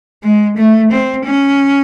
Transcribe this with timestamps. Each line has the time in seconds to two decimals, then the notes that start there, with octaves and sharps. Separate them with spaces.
0.23 G#3
0.57 A3
0.91 C4
1.25 C#4